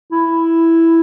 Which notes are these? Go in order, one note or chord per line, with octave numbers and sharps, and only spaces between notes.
E4